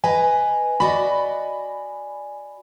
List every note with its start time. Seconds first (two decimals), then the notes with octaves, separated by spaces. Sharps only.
0.04 B4 D#5 G#5 A#5
0.80 F#4 D5 D#5 B5